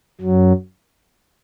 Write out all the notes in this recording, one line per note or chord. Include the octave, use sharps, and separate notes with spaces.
F#2 F#3